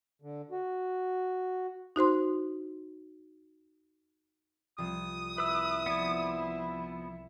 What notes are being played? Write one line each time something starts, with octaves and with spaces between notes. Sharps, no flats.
D3
F#4
D#4 F#4 C5 C6
C2 F3 D#6
E4 B4 E6
F3 B3 D5 G#6